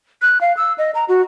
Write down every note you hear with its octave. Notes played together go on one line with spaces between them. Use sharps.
F#6
F5
E6
D#5
A#5
F#4